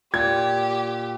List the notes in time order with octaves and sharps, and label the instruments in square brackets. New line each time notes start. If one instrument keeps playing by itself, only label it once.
[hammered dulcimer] A#2 [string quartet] G4 [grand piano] G#6